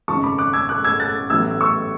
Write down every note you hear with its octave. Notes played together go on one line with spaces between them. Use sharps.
G#1 F#2 C#3 G#3 A5 C#6
B5 D6
D6 F#6
E6 G#6
D6 F#6
E6 G#6
F#6 A6
A1 A2 F#3 B3 E6 G#6
C#6 E6